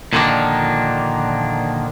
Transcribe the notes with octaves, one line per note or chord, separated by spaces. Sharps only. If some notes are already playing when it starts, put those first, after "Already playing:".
A#2 D3 D#3 F3 A#3 D4